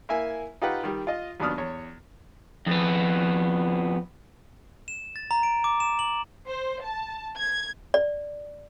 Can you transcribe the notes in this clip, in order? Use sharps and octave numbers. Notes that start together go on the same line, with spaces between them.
A#3 E4 E5 G#5
D#4 F4 G4 B4 F#5
D#3 G3
F4 D#5
D#2 F#3 B3 D4 D#6 F6
E2 C#5
F2 B3
E7
A6
A#5
D7
D6
E7
F#7
C5
A5
G#6
D5